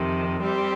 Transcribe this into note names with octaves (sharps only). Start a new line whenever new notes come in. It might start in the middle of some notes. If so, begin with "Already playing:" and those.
Already playing: F2 C3 D#3
G3 C4 G4